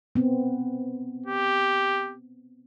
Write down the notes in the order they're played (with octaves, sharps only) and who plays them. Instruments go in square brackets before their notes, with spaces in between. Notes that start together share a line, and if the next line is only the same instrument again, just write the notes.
[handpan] B3 C4
[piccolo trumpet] G4